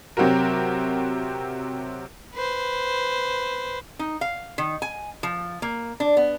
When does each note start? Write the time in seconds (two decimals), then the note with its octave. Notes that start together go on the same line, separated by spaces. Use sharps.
0.17 C3 F#3 C4 F#4 G4 A#4
2.35 B4 C5
3.99 D#4
4.21 F5
4.58 D#3
4.82 G#5
5.23 F3
5.62 A#3
6.00 D4
6.17 B3